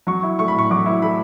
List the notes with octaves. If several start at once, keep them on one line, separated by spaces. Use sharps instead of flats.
F#3 C#6
E4
A3 C#6
B5
A2 C#6
F#3 D6
E4
A3 B5